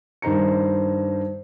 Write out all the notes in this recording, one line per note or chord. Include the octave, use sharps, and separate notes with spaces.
G2 D#3 C5 A#5 C#7